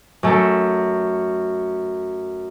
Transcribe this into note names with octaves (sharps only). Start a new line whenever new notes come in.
F#2 A3 A5 D7